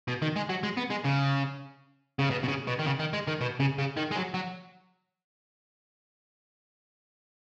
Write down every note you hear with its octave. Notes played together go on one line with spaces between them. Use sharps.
B2
D#3
G#3
F#3
G#3
B3
G#3
C#3
C#3
B2
B2
C#3
B2
D#3
C#3
D#3
G#3
D#3
B2
C#3
C#3
D#3
G#3
F#3
F#3